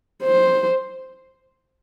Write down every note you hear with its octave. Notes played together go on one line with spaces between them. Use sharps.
C5